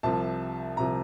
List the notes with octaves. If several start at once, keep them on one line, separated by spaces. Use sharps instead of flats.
C2 C3 F3 A5
C2 C3 F3 A#5